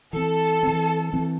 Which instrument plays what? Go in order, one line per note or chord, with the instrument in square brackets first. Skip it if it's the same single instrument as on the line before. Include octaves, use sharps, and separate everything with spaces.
[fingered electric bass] E3 C4 [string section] A4
[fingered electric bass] E3 C4
E3 C4